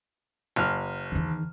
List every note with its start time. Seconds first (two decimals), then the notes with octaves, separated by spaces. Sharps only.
0.56 F#1 F6
1.12 E2 D#3